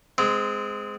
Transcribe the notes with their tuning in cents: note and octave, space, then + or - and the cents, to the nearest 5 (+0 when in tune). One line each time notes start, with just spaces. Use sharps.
G#3 +0 C4 -25